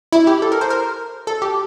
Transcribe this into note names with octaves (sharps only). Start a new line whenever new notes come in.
E4
G4
A4
A#4
C5
A#4
A4
G4